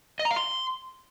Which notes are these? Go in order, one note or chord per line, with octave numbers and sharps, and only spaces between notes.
D#5
A#5
F5
C6